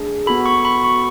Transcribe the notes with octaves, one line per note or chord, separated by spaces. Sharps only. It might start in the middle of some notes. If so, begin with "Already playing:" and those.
Already playing: A3 D4 G#4
B3 F#4 A4 B5
C#6
C#6
B5
C#6